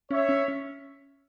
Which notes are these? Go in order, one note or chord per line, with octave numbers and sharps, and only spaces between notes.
C#4 C#5 E5
C#4
C#4